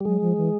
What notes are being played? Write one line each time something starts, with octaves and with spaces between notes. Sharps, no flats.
G3
F#3 G#3
F3
E3